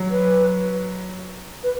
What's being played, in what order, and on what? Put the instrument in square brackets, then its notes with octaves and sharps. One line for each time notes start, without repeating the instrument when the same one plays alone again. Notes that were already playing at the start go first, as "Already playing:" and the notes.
Already playing: [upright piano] F#3
[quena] B4
B4